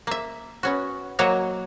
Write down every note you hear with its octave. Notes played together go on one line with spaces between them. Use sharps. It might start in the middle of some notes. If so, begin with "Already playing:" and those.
A#3 E5
B3 C#4 F#4
F#3 A#3 F#4 C#5 D#5